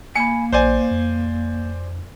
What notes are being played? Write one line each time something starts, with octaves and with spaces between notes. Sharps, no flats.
A#3 G#5 B5 C#7
A#1 C5 D5 G#5
F2